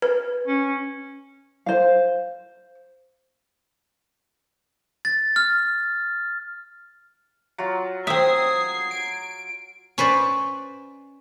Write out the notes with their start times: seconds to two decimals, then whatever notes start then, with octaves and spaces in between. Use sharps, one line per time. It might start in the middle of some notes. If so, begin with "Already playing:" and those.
0.02 B4
0.47 C#4
1.66 C5 F5
5.05 A6
5.36 F6
7.58 F#3 F4
8.07 C4 E5 D#6 G#6 C7
8.91 D7
9.98 C#4 B4 C5 D5